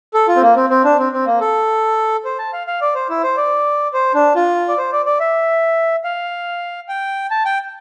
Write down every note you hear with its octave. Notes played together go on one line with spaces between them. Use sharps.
A4
F4
C4
A#3
C4
C4
D4
C4
C4
A#3
A4
C5
A5
F5
F5
D5
C5
E4
C5
D5
C5
D4
F4
D5
C5
D5
D5
E5
F5
G5
A5
G5